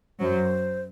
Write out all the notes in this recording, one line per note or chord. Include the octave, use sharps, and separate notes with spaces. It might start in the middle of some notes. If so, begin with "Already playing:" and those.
F#2 F#3 C5